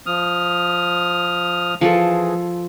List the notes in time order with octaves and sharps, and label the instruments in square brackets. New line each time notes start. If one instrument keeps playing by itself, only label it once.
[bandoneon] F3 D#6 F6
[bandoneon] E3 G#4 [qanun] F3 F4 A4